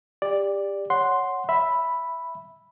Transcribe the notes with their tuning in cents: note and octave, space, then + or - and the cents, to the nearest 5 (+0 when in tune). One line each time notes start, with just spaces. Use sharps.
G4 +25 D5 +0
C#5 +0 F#5 +0 C6 +0
E5 +0 B5 +0